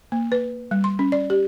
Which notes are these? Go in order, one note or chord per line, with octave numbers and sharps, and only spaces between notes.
A#3
B4
G3
C6
C#4
D5
G4